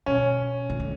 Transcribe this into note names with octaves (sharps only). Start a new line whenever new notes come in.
B2 C#4
D#3
D3